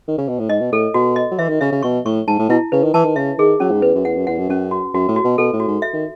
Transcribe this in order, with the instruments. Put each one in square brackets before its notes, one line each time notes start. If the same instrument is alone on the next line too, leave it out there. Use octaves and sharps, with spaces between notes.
[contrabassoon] D#3
C#3
B2
A2
[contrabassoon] G#2 [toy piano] D#5
[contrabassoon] B2
[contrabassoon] A2 [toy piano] A4
[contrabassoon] B2 [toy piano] F#4
[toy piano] D#5
[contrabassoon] F#3
[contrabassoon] E3 [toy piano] E5
[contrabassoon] D#3
[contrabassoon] C#3 [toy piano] E5
[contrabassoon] C#3
[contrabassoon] B2 [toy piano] C#6
[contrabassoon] A2 [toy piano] C#6
[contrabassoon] G#2 [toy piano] A5
[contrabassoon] A2
[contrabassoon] B2 [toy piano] E4
[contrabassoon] C#3 [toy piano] B4
[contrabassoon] D#3
[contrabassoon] E3 [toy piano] A5
[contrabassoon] D#3
[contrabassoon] C#3 [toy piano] E5
[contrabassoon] D#3 [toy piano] G#4
[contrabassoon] F#3 [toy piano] C#4
[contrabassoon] G#2
[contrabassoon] E2 [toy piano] B4
[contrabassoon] F#2
[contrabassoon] E2 [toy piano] F#5
[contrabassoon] F#2
[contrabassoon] E2 [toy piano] F#5
[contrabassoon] F#2
[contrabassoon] F#2 [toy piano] C#4
[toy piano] F#4
[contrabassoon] F#2 [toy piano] F#4
[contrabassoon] A2
[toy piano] F#4
[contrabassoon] B2
[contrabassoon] B2 [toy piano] A4
[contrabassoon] A2
[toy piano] F#4
[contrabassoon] G#2
[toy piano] E5
[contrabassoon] D#3